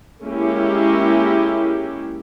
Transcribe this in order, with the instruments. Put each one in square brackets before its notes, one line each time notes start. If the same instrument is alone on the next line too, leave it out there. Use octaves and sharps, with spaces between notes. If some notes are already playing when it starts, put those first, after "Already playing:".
[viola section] G#3 A#3 C#4 E4 G4